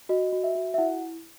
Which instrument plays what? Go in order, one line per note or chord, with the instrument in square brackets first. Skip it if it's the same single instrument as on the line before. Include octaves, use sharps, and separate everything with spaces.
[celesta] F#4 D#5
F#4
E5
F#4
E5
E4 F#5